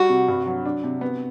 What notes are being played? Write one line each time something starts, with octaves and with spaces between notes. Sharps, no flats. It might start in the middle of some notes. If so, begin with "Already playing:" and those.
Already playing: G3 F#4
C3
G2
F#3
D4
C3
B3